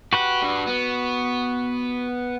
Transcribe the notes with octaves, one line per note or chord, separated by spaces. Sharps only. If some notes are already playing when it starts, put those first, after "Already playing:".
F#4 G4 B4 F#5
G2 G3
B3